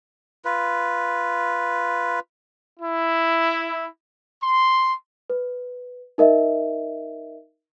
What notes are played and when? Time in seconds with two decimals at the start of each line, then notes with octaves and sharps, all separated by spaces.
0.45 F4 B4
2.80 E4
4.41 C6
5.30 B4
6.18 D#4 A#4 D#5 E5